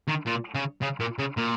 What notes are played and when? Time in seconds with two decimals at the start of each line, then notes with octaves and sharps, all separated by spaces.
0.08 D#3
0.27 A#2
0.55 C#3
0.82 C#3
1.00 A#2
1.19 C#3
1.37 A#2